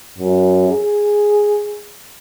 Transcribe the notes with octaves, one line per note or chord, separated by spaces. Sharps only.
F#2
G#4